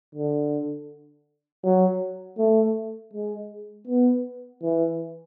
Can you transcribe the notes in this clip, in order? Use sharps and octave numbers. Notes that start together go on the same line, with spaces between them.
D3
F#3
A3
G#3
B3
E3